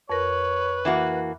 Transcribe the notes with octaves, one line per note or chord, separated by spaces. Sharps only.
F2 A#4 B4 C#5
E3 A#3 F#4 E5